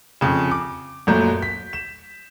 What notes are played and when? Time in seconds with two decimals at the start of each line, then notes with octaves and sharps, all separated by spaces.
0.21 F2 C#3
0.51 D6
1.07 F#1 A#2 F#3 A3 A#5 G6
1.42 B6
1.73 E7